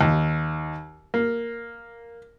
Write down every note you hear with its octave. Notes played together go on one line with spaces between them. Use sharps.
D#2
A#3